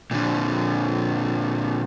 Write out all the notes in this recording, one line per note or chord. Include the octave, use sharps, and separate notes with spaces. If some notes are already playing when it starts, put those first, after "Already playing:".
A#2 D3